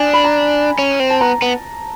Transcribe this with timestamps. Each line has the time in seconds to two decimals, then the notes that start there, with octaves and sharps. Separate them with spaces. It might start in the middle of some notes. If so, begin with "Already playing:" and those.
Already playing: D4 G#5
0.14 B5
0.24 A#5
0.79 C#4
1.00 C4
1.10 A5
1.21 B3 A#5
1.42 B3